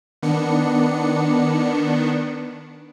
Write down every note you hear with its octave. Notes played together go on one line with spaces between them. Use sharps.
D#3 B3 D4 C#7